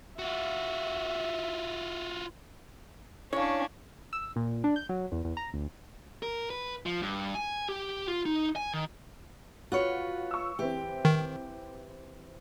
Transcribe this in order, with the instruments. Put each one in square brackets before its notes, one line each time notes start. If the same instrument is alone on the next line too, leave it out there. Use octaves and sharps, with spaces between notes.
[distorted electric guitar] F4 F#4 [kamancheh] E5
[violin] C#4 D4 [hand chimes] E4 F5 [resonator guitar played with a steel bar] C#5
[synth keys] E6
A#2
D4
G6
F#3
E2
E2
A#5
D2
[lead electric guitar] A#4
B4
F3
G2
G#5
G4
F4
D#4
G#5
D#3
[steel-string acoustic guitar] F4 B4 C#5 [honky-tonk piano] F#4
[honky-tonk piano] C#6 E6
[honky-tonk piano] E3 C4 [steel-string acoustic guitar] G4
[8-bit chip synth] D#3